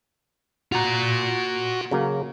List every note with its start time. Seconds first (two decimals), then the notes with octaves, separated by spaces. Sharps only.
0.72 F4 F#4 A#5
1.91 C#3 F#3 A#3